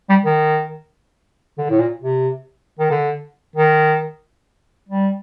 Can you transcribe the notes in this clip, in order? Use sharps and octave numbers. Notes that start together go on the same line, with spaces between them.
G3
D#3
D3
A2
A#2
C3
D#3
D3
D#3
G3